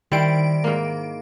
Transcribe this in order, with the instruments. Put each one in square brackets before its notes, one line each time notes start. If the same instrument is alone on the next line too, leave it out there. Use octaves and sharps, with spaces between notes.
[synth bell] D#3 D7 [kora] G3 E4 C5
[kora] G#2 A#3